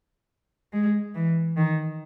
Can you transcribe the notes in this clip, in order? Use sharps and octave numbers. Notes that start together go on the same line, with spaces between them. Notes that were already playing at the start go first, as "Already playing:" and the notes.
G#3
E3
D#3